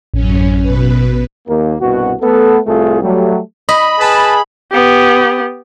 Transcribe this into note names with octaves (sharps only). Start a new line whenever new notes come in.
A1 F#2 C#4
B2 B4
D#2 A#3
C2 G2 B2 F#4
A3 B3 A4
C2 A2 A3 F4 G#4 A4
F#3 G3 A3
D#5 B5
G#4 B4 A5
B3 G4